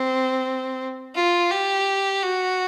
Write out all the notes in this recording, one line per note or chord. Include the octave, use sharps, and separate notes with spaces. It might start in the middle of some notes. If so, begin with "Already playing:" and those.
Already playing: C4
F4
G4
F#4